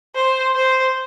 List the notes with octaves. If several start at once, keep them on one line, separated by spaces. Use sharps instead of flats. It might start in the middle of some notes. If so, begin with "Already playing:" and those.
C5
C5